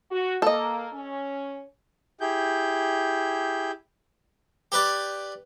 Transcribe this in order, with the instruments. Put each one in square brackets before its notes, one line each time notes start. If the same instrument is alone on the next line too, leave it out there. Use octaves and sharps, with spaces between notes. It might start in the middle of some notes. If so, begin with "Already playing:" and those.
[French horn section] F#4
[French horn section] A#3 [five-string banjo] A4 D#5
[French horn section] C#4
[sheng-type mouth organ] E4 G4 G#4 G6
[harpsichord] G4 B4 D5